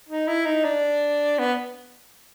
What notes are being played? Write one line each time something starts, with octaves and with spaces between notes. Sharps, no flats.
D#4
E4
D#4
D4
B3